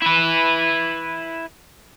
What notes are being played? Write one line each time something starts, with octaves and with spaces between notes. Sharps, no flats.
E4 B4